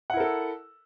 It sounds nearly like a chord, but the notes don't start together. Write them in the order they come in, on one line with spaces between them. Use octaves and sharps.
F#5 E4 A#4 A4